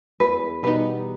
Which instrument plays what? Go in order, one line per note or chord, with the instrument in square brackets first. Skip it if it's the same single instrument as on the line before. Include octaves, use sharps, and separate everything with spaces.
[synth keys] E2 [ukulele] B4
[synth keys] B2 G3 B3 D#4 [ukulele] B4